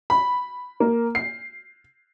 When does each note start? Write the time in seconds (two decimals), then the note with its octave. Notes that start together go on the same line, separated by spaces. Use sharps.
0.10 B5
0.80 A#3
1.15 C7